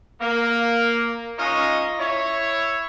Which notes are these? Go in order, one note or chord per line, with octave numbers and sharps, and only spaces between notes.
A#3
G#3 C#4 D#4 F4 C#5 D#5
E4 C#5